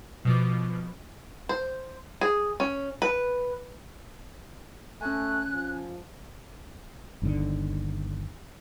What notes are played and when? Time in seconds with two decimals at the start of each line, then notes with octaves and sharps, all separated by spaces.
0.25 B2 F3 D6
1.49 C5
2.21 G#4
2.60 C#4
3.02 B4
5.01 A3 C#4 G#5 F#6
5.53 F3
7.22 G1 D#2 D3